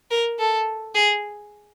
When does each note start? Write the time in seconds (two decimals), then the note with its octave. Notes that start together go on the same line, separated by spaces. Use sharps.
0.11 A#4
0.39 A4
0.95 G#4